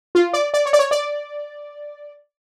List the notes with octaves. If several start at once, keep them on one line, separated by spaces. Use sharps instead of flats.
F4
D5
D5
C#5
D5
C#5
D5